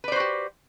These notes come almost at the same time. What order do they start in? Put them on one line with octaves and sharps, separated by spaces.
B4 D5 C5 F#4 G4